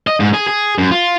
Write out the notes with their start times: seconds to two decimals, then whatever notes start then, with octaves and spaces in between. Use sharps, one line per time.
0.07 D#5
0.20 G#2
0.34 G#4
0.48 G#4
0.78 F#2
0.92 F4